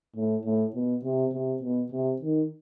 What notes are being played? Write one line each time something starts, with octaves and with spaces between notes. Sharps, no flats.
A2
A2
B2
C3
C3
B2
C3
D#3